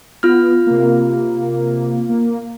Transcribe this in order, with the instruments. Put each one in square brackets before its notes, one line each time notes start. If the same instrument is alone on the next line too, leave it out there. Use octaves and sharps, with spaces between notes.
[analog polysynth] B3 [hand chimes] F4 F6
[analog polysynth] C3 A#3
A#3